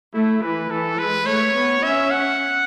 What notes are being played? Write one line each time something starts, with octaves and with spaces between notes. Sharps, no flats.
A3 E4
E3 B4
E3 A4
G#3 B4
A3 C#5
B3
C#4 E5
F#5